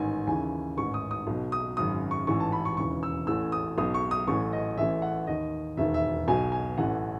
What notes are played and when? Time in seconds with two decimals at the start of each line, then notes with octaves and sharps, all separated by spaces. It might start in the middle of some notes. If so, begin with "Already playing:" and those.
Already playing: A1 G#2 D#3 G#5
0.27 D#2 C#3 E3 G#5
0.77 A1 G#2 D#3 C#6
0.94 D#6
1.11 D#6
1.27 B1 B2
1.52 D#6
1.77 G#1 F#2 C#3 D#6
2.11 C#6
2.27 A1 G#2 E3 C#6
2.40 A5
2.52 B5
2.65 C#6
2.77 E1 D#2 C#3 E3 C#6
3.03 E6
3.27 A1 A2 E3 E6
3.52 D#6
3.78 B1 B2 D#6
3.94 C#6
4.11 D#6
4.28 A1 A2 E3 C#6
4.53 D#5
4.77 A1 A2 E3 E5
5.02 F#5
5.27 D#2 D#3 D#5
5.77 E1 D#2 D#3 E5
5.94 E5
6.28 B1 B2 G#5
6.52 G#5
6.78 A1 A2 E3 F#5